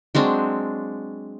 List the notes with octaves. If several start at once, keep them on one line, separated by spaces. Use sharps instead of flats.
F#3 G#3 C4 D4